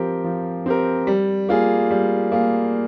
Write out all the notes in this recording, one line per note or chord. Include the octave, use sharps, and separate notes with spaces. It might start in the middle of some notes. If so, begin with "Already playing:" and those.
Already playing: F3 C4 G4 A#4
F3
C4 G4 A#4
G3
A#3 F4 G#4
G3
A#3 F4 G#4